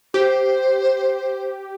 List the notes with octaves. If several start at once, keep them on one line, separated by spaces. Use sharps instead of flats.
G4 C5